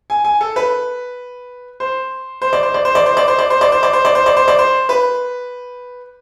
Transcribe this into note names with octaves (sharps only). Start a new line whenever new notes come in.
G#5
G#5
A4
B4
C5
C5
D5
C5
D5
C5
D5
C5
D5
C5
D5
C5
D5
C5
D5
C5
D5
C5
D5
C5
D5
C5
B4